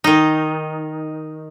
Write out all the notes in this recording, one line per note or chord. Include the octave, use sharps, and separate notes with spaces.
D#3 D#4